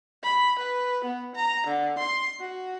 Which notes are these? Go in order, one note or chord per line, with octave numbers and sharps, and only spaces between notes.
B5
B4
B3
A#5
D3
C6
F#4